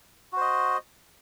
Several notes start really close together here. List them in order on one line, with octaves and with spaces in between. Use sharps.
F#4 C5 D#5